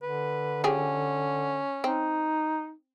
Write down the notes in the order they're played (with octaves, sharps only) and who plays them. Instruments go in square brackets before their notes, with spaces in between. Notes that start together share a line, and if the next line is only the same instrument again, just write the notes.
[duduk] D3 [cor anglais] B4
[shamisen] F3 G4 G#4 [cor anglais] C#4
[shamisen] C4 [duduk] D#4